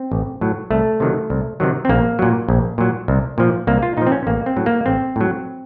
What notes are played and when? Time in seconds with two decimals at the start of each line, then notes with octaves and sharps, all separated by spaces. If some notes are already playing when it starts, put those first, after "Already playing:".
Already playing: C4
0.12 A1
0.41 A2 F#3
0.70 C2 A3
1.00 C3 D#3 F#3
1.30 C2
1.60 C3 D#3 F#3
1.85 C4
1.89 A#1 A#3
2.19 A#2 F#3
2.49 A#1
2.78 A#2 F#3
3.08 C2
3.38 A#2 F3
3.67 C2 A#3
3.82 F4
3.97 A#2 F3 D#4
4.07 C4
4.12 C#4
4.27 A1 A#3
4.46 C4
4.56 A2 F#3
4.66 A#3
4.86 A1 C4
5.16 A2 F#3